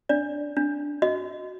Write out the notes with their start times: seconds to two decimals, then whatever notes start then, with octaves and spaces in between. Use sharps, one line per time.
0.09 D4 D5
0.57 D4
1.02 F#4 D#5